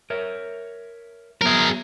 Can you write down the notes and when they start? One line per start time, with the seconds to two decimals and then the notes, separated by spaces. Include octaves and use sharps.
0.10 A#4 C#5 E5
1.42 F#3 B3 G#4 A#4 E5